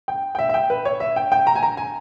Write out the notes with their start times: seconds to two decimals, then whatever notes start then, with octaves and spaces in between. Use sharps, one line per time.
0.08 G5
0.35 G5
0.39 E5
0.49 E5
0.54 G5
0.70 B4
0.85 C#5
1.00 E5
1.16 G5
1.32 G5
1.47 A#5
1.55 G#5
1.63 A#5
1.77 G#5